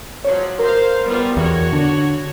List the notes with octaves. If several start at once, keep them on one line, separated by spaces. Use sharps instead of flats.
F3 F#3 C#5
A#4 C5 F5
G3 B3 F4
E2 F#4 C#5
D3